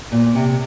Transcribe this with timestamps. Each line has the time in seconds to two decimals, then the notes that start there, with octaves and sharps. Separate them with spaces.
0.12 A#2
0.35 C3